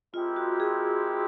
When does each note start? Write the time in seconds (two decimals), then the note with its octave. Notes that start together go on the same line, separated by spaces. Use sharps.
0.14 G#3 C4 E4 F4 G4 A#4
0.36 F#4
0.60 G#4